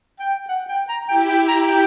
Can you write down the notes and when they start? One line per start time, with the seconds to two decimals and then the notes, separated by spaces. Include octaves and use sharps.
0.20 G5
0.49 F#5
0.69 G5
0.89 A#5
1.08 E4 G4 G5
1.28 G5
1.48 A#5
1.68 G5